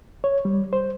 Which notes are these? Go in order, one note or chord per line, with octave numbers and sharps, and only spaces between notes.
C#5
G3
C5